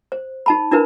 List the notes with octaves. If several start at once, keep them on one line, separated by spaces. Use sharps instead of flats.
C5
D#4 A5 B5
D4 E4 A#4 B4